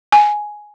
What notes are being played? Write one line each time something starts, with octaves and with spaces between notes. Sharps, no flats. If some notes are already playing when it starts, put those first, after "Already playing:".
G#5